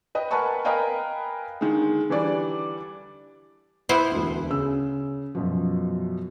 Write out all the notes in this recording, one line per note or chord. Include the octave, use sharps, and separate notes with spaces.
B4 D#5 G5
A#4 B4 F#5 G#5 A5 C#6
A#4 B4 D#5 F5 G5 G#5
D3 D#3 G#3
D3 E3 G3 D4 D5
B3 E4 C5
E1 D2
C#3 E6
F#2 B2 F3